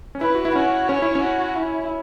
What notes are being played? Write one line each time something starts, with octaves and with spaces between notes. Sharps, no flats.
C#4
E4 B4
F#4
E4
C#4 F#4
C#4 C#5
E4
C#4
F#4
E4